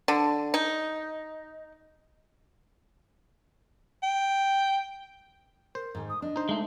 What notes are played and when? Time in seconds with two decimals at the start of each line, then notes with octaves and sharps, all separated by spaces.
0.08 D3
0.54 D#4
4.03 G5
5.75 A#4 C5
5.95 G#2 D#3
6.09 D#6
6.22 D4 D#5
6.36 D#4 C5
6.49 G#3 A3